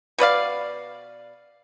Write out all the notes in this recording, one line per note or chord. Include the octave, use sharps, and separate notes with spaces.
B2 B4 D5 F5